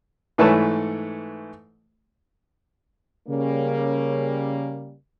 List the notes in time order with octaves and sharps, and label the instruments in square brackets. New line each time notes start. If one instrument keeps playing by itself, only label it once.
[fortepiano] G#2 E3 A3 B4 C#5 A5
[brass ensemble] C#3 G3 A#3 C#4